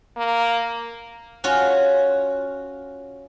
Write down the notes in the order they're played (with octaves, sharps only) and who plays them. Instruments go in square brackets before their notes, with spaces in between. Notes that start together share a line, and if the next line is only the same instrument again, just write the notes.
[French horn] A#3
[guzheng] C#4 F4 F#4